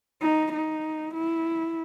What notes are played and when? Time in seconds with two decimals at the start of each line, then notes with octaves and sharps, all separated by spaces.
0.22 D#4
0.52 D#4
1.14 E4